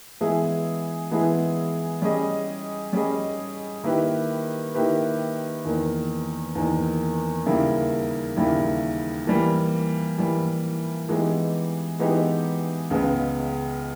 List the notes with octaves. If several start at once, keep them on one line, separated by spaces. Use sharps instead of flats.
E3 G#3 B3 E4 G#4
E3 G#3 B3 E4 G#4
G3 C#4 G#4 D#5
G3 C#4 G#4 D#5
D#3 A#3 E4 G4 B4
D#3 A#3 E4 G4 B4
E2 D#3 A#3
E2 D#3 A#3
D#2 C#3 G3 A#3 E4
D#2 C#3 G3 A#3 E4
E3 G3 A#3
E3 G3 A#3
E3 G#3 B3 D#4 G4
E3 G#3 B3 D#4 G4
C#2 C#3 G#3 B3